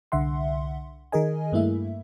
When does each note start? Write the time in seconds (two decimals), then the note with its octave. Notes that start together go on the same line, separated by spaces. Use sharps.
0.12 C2 D3 E5 F#5 C6
1.12 D#3 G#4 A#4 D#5 G#5
1.52 G2 A3 A#3 E4 E5